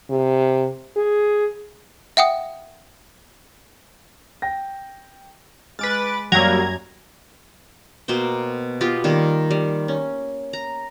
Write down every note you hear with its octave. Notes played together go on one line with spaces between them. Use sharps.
C3
G#4
E5 F#5 G5 D#6
G5 A#6
G#3 B4 D6 F6 A6
F#2 F#3 G3 A#3 A#5 G#6
B2 A#3 C5 G5
B3 F4 G4 D#5
D#3 G3 A#3
G3
C#4
A#5